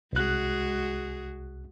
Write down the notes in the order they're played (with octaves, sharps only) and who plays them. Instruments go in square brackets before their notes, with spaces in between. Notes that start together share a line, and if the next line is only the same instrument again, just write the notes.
[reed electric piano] C2 F#6 [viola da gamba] G#3 F#4 G#4